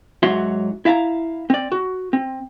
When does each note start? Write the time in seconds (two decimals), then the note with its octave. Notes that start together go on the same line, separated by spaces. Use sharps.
0.23 G#2 F#3 F#4 C#5 E5 C6
0.85 E4 E5 F5 A5 A#5
1.50 C4 D5
1.72 F#4
2.13 C4